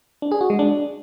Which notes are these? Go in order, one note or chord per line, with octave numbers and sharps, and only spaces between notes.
D4
G#4
F#4
G#3
D4